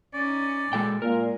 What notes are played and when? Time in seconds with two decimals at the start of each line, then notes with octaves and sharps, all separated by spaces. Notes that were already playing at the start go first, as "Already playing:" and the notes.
0.14 C#4 D#4 D5
0.73 A#2 G#3 A4 G5
1.02 A#2 G#3 A#4